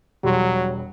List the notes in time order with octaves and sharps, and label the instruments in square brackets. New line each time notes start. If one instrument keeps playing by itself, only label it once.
[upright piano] E1 G3 C6 [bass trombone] F#3